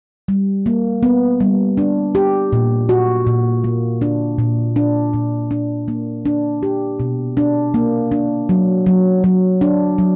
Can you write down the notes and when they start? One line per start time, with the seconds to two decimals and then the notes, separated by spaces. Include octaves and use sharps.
0.28 G3
0.66 A#3
1.03 B3
1.41 G3
1.78 D4
2.15 G4
2.53 A#2
2.89 F#4
3.27 A#2
3.64 A#3
4.01 D4
4.39 A#2
4.76 D4
5.13 A#2
5.51 D4
5.88 A#3
6.26 D4
6.63 G4
7.00 B2
7.37 D4
7.74 A#3
8.12 D4
8.49 F#3
8.86 F#3
9.24 F#3
9.61 D4
9.98 F#3